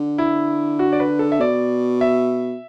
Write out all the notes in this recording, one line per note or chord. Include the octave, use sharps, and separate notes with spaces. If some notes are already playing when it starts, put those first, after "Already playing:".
Already playing: D3
E4
F#4
D5
B4
A4
E5
B2 D5
E5